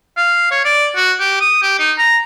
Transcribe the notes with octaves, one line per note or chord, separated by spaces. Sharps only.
F5
C#5
D5
F#4
G4
D#6
G4
D#4
A#5